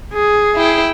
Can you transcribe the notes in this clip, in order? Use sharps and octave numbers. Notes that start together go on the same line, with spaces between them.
G#4
E4 G5